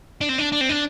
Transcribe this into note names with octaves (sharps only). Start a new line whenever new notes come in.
D4
C4
D4
D4
C4
D4